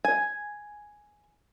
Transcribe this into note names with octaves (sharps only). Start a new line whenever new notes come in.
G#5